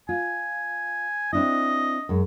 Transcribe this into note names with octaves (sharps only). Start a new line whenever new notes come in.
F4 G#5
C4 D4 E4 D#5
F#2 G#3